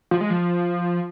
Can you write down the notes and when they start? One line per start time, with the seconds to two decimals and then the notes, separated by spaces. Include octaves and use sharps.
0.11 F3
0.21 G#3
0.30 F3